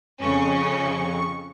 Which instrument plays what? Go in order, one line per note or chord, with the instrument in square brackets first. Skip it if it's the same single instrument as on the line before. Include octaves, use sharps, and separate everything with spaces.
[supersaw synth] F2 C#6 [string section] C#3 C#4